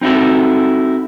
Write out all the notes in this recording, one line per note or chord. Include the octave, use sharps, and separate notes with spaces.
C4 D#4 E4 F#4 A4